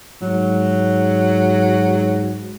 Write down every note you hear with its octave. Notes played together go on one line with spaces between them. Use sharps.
G#2 F#3